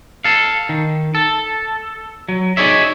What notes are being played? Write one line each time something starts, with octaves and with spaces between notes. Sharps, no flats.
A4 F5
D#3
A4
F#3
D#4 G#4 C#5 D5 E5